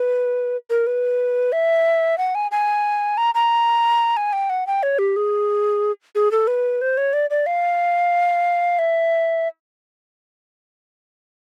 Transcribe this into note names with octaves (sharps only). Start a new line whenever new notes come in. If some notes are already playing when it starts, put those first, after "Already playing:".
Already playing: B4
A#4
B4
E5
F#5
G#5
G#5
A#5
A#5
G#5
G5
F#5
G5
C#5
G4
G#4
G#4
A4
B4
C5
C#5
D5
D5
F5
E5